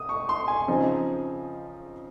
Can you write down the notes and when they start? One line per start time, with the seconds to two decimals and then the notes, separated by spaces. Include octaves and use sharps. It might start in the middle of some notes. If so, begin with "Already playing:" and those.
Already playing: D#6
0.09 C#6
0.29 C6
0.48 G#5
0.68 C#3 F3 C4 D#4